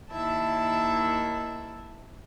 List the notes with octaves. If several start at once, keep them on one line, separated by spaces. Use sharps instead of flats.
D#2 D#3 E4 E5 A5